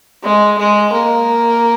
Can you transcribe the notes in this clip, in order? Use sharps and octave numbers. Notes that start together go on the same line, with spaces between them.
G#3
G#3
A#3